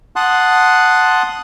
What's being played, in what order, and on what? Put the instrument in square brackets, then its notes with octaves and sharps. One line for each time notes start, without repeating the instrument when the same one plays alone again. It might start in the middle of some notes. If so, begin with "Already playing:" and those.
[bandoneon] F#5 A5 C6 D#6 F#6